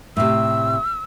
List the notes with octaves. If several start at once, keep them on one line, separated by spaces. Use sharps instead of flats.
A2 C3 E6